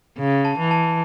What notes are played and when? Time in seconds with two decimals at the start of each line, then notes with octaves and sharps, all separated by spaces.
0.18 C#3
0.45 A5
0.58 E3
0.71 A5